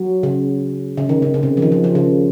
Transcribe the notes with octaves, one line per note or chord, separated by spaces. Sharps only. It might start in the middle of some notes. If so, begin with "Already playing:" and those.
Already playing: F#3
C#3
C#3
D#3
C#3
C#3
C3
F3
D#3
F3
F3
C#3